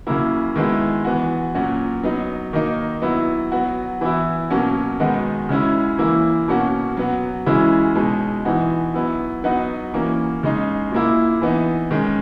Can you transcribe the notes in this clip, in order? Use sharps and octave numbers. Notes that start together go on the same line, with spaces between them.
C#3 F#3 A#3 E4
D#3 G#3 B3 E4
E3 B3 F#4
A#2 F#3 C#4 F#4
F#3 B3 D#4
D#3 A#3 D#4
F#3 B3 E4
F#3 B3 F#4
E3 B3 E4
B2 F#3 A#3 C#4 F#4
D#3 G#3 B3 D#4 F#4
C#3 G#3 C#4 E4
E3 A#3 E4
B2 A#3 C#4 F#4
F#3 B3 F#4
C#3 E3 G#3 C#4 E4
B2 G#3 D#4
E3 B3 D#4 F#4
F#3 B3 E4
F#3 B3 D#4 F#4
E3 A#3 C#4
C#3 G#3 D#4
A#2 A#3 E4
E3 B3 D#4
D#3 G#3 C#4